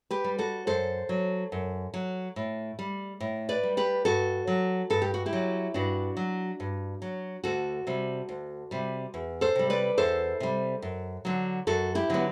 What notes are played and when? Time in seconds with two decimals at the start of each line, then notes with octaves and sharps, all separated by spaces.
0.11 G4 B4
0.24 G3
0.38 F#4 A4
0.67 F#2 A4 C5
1.09 F#3
1.52 F#2
1.94 F#3
2.36 A2
2.79 G3
3.20 A2
3.49 B4 D5
3.63 G3
3.77 G4 B4
4.05 G2 F#4 A4
4.47 F#3
4.90 G2 A4
5.02 G4
5.14 F#4
5.26 E4 G4
5.33 F#3
5.74 G2 D4 F#4
6.17 F#3
6.60 G2
7.02 F#3
7.44 D2 F#4 A4
7.87 C3 G3
8.29 D2
8.71 C3 G3
9.14 E2
9.41 A4 C5
9.56 C3 G3
9.70 B4 D5
9.98 E2 A4 C5
10.40 C3 G3
10.82 F#2
11.25 D3 F#3
11.67 F#2 F#4 A4
11.95 E4 G4
12.10 D3 F#3 B3